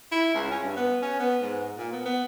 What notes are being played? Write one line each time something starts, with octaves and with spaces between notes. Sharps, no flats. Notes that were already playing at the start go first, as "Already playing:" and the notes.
E4
C#2
C#4
G2
B3
C#4
B3
G#2
A#2
B3
B3